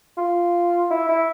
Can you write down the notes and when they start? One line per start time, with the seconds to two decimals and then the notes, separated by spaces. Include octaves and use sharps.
0.17 F4
0.91 E4
1.09 E4